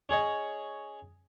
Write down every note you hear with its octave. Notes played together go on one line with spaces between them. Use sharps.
C#4 G#4 C#5 D#5